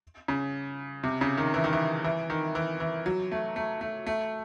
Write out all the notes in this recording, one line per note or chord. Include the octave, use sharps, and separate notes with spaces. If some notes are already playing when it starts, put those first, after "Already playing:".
C#3
C3
C#3
D#3
E3
D#3
E3
E3
D#3
E3
E3
F#3
A3
A3
A3
A3